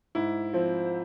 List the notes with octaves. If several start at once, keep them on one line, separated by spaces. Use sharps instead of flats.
G#2 E4
F3 C4